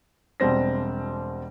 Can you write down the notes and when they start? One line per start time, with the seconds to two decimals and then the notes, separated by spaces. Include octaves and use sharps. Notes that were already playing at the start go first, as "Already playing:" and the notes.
0.40 E1 B2 G3 C4 A#6